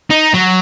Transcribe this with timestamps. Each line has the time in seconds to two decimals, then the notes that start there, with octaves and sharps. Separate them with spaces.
0.11 D#4
0.34 F#3